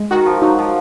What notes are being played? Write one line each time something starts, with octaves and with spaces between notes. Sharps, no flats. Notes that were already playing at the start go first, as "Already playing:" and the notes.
Already playing: G#3
D#3 F#4
F3
F#3 D#4
F3